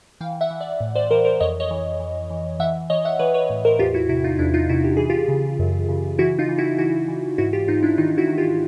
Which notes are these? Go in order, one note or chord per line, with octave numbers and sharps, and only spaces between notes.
E3 F5 G5
E5 F#5
E3
D5 E5
A2
C5 D5
E3 A#4 C5
A#4 C5
F2 C#5 D#5
C#5 D#5
E3
E3
E3
E3 E5 F#5
E3 C#5 D#5
E5 F#5
E3 B4 C#5
B4 C#5
A2
A#4 C5
E2 F4 G4
E4 F#4
C3 E4 F#4
D#4 F4
E2 D4 E4
D#4 F4
C3 E4 F#4
G4
E3 G#4
F4 G4
C#3
F#2
C#3
E3 E4 F#4
D#4 F4
E3
E4 F#4
E3 E4 F#4
E3
G#2 E4 F#4
F4 G4
G#2 D#4 F4
D4 E4
D#3 D#4 F4
E4 F#4
D#3
F4 G4